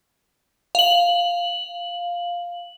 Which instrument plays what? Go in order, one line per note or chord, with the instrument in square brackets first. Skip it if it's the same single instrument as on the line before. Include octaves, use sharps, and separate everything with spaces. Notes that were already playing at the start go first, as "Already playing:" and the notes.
[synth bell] F5 F#7